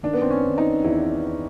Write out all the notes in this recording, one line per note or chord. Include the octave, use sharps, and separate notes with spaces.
D#3 D4
B3
C4
C#4
D#3
D#4
E2 E4